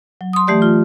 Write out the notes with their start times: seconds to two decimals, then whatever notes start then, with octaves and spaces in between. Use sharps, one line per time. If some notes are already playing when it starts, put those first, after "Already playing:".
0.21 F#3
0.33 C6 D#6
0.47 E3 A3 G4 D5
0.62 F4